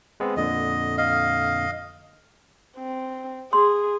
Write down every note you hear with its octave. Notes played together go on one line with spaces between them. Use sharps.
G#3 B3 C4
F2 A#2 D3 D#5
D#5 F5
C4
G#4 C6